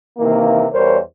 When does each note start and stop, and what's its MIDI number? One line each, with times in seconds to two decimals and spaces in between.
0.18 0.65 48
0.18 0.65 51
0.18 0.65 52
0.18 0.65 58
0.73 0.98 40
0.73 0.98 55
0.73 0.98 70
0.73 0.98 72
0.73 0.98 73